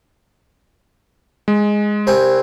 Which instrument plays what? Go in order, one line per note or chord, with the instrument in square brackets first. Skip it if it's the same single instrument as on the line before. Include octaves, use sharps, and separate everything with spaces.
[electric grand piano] G#3
[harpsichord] C2 C4 G#5